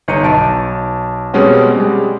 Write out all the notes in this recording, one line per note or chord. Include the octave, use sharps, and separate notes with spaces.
G1 D#4 C#7 D#7
B1 A5 D7
B2 G3 G#3 C4 C#4 F#4
G3 G#3